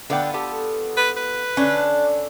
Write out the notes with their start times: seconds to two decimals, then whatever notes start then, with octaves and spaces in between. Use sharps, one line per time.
0.10 D3 B3 F4 D5 G5
0.34 G4 A4
0.97 B4
1.17 B4
1.57 D3 C#4 D4